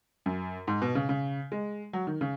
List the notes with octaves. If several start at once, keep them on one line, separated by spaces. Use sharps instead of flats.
F#2
G#2
B2
C#3
C#3
G#3
F#3
D#3
C#3